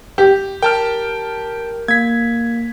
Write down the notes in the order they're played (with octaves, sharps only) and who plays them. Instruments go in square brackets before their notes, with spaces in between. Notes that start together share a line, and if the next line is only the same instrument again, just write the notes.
[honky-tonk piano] G4
[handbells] A#4 [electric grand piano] G5 A5 F6
[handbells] A#3 [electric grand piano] G#6 B6